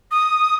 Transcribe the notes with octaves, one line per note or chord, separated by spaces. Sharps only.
D#6